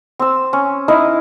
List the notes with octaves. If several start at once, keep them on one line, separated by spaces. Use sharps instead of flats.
C4 E6
C#4
D#4 E4 D#5 F5